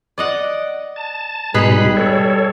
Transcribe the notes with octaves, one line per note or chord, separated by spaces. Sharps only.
D5 D#5 F#5
A5
G#2 B2 G3 D#4 G#4 B4 B5
A4 C#5